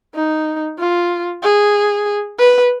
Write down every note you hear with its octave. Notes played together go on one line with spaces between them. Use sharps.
D#4
F4
G#4
B4